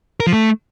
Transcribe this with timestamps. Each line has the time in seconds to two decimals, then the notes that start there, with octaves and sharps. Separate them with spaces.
0.20 A#4
0.27 F3
0.33 A3